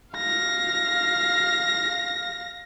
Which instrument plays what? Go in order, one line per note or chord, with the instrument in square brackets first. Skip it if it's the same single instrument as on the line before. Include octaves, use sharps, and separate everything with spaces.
[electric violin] F5 A#6